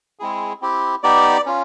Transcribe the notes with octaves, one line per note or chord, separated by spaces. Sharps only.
G#3 C4 E4 G#4
C4 E4 G4
B3 D#4 G4 D5
C#4 F4